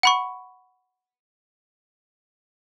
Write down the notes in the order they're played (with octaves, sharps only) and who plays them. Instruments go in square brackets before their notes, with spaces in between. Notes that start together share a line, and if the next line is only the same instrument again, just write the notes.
[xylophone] F#5 B5 C#6